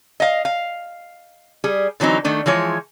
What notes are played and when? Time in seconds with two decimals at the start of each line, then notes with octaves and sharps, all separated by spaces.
0.20 D#5 F5
0.45 F5
1.64 G3 G#4
2.00 D3 E3 F#3 C4 D#4
2.24 D#3 A3 D4
2.46 E3 F3 G#3 C#5